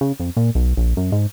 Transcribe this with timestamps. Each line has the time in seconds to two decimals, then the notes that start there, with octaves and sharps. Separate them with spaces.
0.01 C#3
0.20 F2
0.37 A#2
0.55 B1
0.77 A#1
0.97 F#2
1.12 G#2